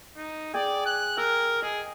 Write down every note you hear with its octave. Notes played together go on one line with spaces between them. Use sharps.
D#4
G#4 D5 G5 G#5
F#6
A#4 E6
G#4 D#5